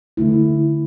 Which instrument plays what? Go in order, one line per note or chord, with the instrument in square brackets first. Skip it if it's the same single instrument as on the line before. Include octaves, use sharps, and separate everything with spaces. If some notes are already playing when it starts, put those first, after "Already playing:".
[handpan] D3 A3 E4